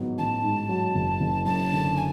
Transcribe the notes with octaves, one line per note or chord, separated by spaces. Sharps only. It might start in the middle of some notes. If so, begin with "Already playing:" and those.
Already playing: A1 G#2 F#3 B3
A1 A5
G#2
F#3
F#1
F#1
F#2 A5
D3
G#5